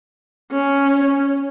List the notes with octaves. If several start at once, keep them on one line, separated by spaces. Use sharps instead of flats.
C#4